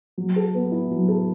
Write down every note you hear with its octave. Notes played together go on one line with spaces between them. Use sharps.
F#3
A4
B3
E4
F#3
A4